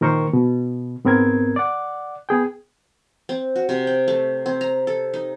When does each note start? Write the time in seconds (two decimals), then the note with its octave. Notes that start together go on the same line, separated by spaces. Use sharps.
0.01 A#2 D#3 A#4 C5 C#6
0.33 B2
1.05 G#2 B3 C4 A#4 G#6
1.56 D5 F#5
2.29 B3 G#4 G5
3.29 C4
3.56 F#4
3.69 C3
3.87 G5
4.08 A3
4.46 C4
4.61 A#5
4.87 A4
5.14 D#4